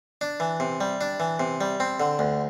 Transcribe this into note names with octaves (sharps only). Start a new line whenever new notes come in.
D4
E3
C3
G3
D4
E3
C3
G3
C4
D3
D2